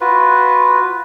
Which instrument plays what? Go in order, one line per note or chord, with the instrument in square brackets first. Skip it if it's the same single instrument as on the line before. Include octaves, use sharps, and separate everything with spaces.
[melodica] F4 F#4 B4